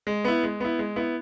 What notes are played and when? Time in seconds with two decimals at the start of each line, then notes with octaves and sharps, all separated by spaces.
0.07 G#3
0.25 B3 E4
0.43 G#3
0.60 B3 E4
0.79 G#3
0.96 B3 E4